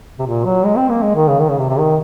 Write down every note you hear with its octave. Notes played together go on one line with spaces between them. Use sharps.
C3
A#2
F#3
G#3
C4
A#3
G#3
D#3
C#3
D#3
C#3
C3
C3
D#3